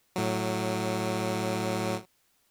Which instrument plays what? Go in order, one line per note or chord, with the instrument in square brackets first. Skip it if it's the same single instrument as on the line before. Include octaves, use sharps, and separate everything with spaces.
[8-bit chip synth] A2 F#3